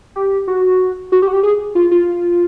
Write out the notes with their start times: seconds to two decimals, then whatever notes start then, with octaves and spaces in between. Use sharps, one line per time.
0.16 G4
0.48 F#4
1.12 F#4
1.22 G4
1.28 F#4
1.33 G4
1.43 G#4
1.75 F4
1.91 F4